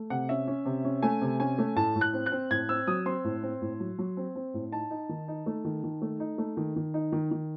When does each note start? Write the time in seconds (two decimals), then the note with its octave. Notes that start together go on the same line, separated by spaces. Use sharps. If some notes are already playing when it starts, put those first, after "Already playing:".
Already playing: A3
0.10 C3 F#5
0.29 C#4 E5
0.47 C#4
0.65 C3
0.85 C#4
1.03 A3 G#5
1.22 C3
1.40 C#4 G#5
1.58 A3
1.76 A2 A5
1.96 A2
2.01 F#6
2.14 C4
2.26 F#6
2.32 C4
2.51 A2 G#6
2.69 C4 E6
2.87 F#3 D#6
3.06 C4 C6
3.24 A2
3.43 C4
3.62 A2
3.80 F#3
3.99 F#3
4.17 C4
4.35 C4
4.54 A2
4.72 D#4 A5
4.91 D#4
5.09 D#3
5.28 D#4
5.46 A3
5.65 D#3
5.84 D#3
6.02 A3
6.20 D#4
6.38 A3
6.57 D#3
6.76 D#3
6.94 D#4
7.12 D#3
7.31 D#3